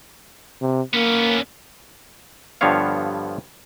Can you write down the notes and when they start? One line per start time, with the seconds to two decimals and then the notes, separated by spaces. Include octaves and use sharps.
0.61 C3
0.94 A#3 B3 C#4
2.61 G2 D3 F3 B3 C#5 F5